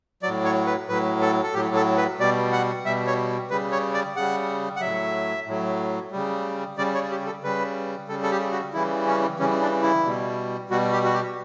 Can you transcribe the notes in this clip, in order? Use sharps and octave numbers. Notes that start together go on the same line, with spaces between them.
A2 F#3 D5
C#5
B4
A2 F#3 B4
A4
A4
A2 F#3 G4
A4
B4
B2 G3 D5
F#5
B2 G3 E5
C#5
C#3 G3 B4
C#5
D5
C#3 G3 F#5
F#5
A2 F#3 E5
A2 F#3
C#3 G3
C#3 G3 D5
C#5
G4
A4
C#3 G3 B4
C#3 G3 A4
A4
G4
F#4
C#3 E3 G3 E4
C#4
C#3 E3 G3 C#4
D4
E4
B2 G3
B2 G3 F#4
G4
F#4
G4